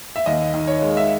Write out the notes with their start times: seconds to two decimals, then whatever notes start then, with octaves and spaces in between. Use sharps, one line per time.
0.16 E5
0.26 D#2 D#5
0.54 D#3
0.67 C#5
0.82 G#3
0.97 E5